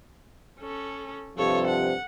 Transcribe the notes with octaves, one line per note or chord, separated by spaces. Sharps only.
C#4 A4
G2 C3 F3 A4 C#5
F#5